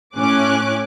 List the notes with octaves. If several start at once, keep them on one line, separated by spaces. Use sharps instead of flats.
A2 C#4 G#5 D6 F#6